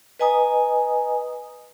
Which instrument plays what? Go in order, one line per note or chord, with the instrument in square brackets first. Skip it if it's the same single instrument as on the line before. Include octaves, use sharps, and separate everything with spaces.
[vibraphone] B4 D#5 G#5 A#5 D#6